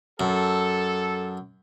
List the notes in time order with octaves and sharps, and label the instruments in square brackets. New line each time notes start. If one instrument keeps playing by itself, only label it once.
[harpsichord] F#2 [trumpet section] A4